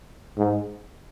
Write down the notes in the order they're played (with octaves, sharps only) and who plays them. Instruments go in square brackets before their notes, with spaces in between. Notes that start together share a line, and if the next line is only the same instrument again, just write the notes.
[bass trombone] G#2